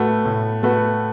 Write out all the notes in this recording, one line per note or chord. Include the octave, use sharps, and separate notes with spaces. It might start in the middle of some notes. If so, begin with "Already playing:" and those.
Already playing: A2 A3 F#4 B4
A2
A3 F#4 B4